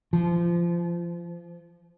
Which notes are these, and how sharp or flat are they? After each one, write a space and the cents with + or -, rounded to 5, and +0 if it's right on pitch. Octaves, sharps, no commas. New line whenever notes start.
F3 -25